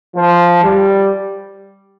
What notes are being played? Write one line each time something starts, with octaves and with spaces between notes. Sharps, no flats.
F3
G3